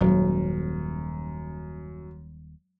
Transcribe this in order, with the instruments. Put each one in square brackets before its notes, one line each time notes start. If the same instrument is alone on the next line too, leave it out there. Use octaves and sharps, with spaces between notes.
[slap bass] D#1 [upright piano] F#2 [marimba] F#3 G#3